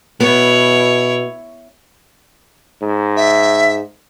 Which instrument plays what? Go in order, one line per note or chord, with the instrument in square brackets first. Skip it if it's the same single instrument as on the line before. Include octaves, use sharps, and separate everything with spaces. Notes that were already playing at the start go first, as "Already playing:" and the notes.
[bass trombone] B2 [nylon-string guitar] B3 [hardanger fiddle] E4 C#5
[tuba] G#2
[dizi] E5